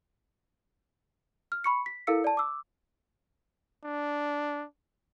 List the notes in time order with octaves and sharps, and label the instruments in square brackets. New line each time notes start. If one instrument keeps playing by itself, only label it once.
[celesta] F6
B5 C#6 C#7
B6
E4 A4 A#4 F5 E6 C#7
D5 A5
D6 E6
[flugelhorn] D4